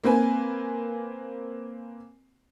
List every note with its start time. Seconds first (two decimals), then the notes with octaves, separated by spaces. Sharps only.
0.04 A#3 C4 B4 G#5